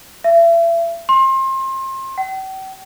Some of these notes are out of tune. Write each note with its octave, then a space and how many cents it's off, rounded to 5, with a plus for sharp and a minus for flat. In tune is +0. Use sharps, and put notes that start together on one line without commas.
E5 +35
C6 +30
G5 -45